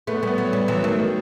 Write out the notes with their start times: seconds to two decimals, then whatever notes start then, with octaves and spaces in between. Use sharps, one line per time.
0.07 A3 B3
0.23 G3 B3
0.38 F#3
0.53 G3
0.68 E3 F#3
0.83 D#3 A3
0.99 D#3